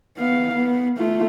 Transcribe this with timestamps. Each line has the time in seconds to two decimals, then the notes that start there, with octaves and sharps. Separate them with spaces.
0.18 B3 F5
0.54 B3
0.98 A3 F4